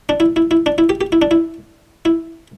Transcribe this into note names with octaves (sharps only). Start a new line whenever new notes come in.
D4
E4
E4
E4
D4
E4
G4
G4
E4
D4
E4
E4